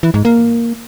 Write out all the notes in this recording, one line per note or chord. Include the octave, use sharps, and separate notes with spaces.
E3
G#2
A#3